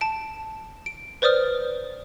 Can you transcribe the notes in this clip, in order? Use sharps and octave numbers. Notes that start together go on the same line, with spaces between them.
A5 D7
D7
B4 C5 D5 D#6 F6